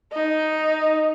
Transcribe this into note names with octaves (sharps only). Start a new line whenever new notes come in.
D#4